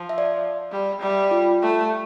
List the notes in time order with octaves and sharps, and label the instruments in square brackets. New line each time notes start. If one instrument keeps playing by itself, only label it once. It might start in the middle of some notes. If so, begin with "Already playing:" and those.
Already playing: [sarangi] F3
[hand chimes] E5
D5
E5
[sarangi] G3
G3
[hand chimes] F4
[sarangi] A3